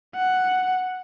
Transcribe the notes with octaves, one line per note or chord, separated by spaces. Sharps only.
F#5